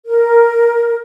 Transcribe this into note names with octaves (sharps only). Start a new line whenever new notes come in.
A#4